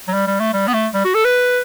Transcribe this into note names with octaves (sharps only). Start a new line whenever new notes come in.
F#3
G3
G3
A3
G3
B3
A3
G3
F#4
A4
B4